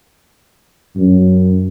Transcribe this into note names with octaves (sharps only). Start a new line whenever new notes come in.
F#2